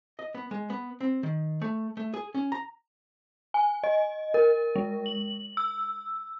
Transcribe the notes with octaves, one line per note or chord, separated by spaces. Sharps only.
D#5
B3
G#3
B3
C4
D#3
A3
A3
G#4
C#4
A#5
G#5
D#5
A#4
G#3
F#7
E6